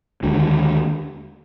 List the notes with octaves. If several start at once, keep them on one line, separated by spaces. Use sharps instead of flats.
D#2 D3 G#3